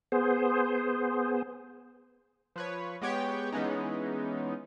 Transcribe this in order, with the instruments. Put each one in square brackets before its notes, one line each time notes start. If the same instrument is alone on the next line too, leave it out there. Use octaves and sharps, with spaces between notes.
[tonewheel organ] B3 G#4 C5
[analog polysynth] F3 B4 C#5
G#3 B3 G4 C#5 G5
E3 G#3 B3 C#4 D#4